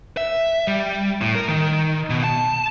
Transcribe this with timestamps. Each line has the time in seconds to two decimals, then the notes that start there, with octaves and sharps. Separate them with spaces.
0.17 E5
0.67 G3
1.21 A2
1.35 A#4
1.49 D#3
2.10 B2
2.24 A5